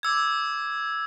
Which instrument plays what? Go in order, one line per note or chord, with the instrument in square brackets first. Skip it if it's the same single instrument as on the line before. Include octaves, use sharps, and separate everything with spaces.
[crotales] D6 E6 G#6